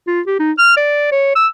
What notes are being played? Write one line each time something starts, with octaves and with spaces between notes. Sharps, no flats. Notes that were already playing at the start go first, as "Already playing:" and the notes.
F4
G4
D#4
F6
D5
C#5
E6